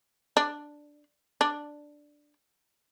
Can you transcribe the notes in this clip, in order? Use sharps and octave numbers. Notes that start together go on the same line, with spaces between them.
D4
D4